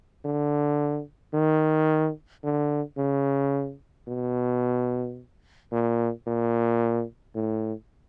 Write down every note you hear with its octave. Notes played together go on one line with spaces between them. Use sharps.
D3
D#3
D3
C#3
B2
A#2
A#2
A2